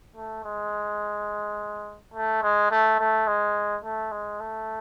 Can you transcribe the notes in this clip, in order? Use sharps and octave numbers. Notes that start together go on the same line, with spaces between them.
A3
G#3
A3
G#3
A3
A3
G#3
A3
G#3
A3